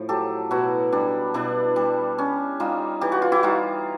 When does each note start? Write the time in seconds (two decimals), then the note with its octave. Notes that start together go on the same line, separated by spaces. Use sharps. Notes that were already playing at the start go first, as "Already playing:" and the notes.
Already playing: A2 F3
0.09 F#3 G4 A4
0.51 B2 E4 F#4
0.92 G3 D4
1.34 B2 D4 E4
1.76 G3
2.18 C#4
2.60 G3 D#4 F4
3.01 E3 G4
3.12 F#4
3.22 F4
3.32 E4 F#4
3.43 G3 D#4 F4